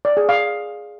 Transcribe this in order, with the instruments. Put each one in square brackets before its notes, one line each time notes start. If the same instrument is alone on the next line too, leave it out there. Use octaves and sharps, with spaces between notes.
[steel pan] D5
G#4
F5